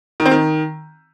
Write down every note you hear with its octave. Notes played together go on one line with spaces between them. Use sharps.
D#3
C4
D#3